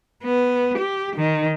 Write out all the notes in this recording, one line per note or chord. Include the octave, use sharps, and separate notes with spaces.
B3
G4
D#3